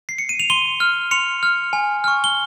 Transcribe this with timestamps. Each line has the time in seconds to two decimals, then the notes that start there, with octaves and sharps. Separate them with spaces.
0.09 C7
0.18 C#7
0.29 D#7
0.40 F7
0.50 C6 D#7 G7
0.80 F6
1.11 C6 C#7 F7
1.43 F6
1.73 G#5
2.04 C#6 F6
2.24 G7